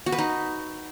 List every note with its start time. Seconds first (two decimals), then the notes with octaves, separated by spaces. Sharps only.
0.06 F#4
0.12 B4
0.18 D#4